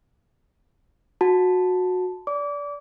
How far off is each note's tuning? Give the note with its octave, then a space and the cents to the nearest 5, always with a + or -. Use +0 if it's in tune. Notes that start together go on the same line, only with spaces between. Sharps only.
F#4 -20 A5 +0
D5 -25 D6 -30